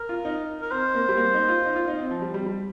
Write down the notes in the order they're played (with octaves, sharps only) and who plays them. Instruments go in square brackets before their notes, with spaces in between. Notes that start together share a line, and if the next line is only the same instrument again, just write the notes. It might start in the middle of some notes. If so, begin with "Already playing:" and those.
Already playing: [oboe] A#4
[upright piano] F4
D#4
[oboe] A#4
[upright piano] C4 [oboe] C5
[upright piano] A#3
G3
A#3
D#4
F4
D#4
F4
D#4
C4
F3
G3
G3
G3